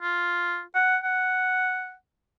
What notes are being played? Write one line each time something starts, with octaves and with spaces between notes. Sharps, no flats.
F4
F#5
F#5